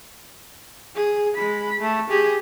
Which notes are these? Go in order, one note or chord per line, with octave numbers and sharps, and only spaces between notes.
G#4
G#3 B5
A3
G4 G#4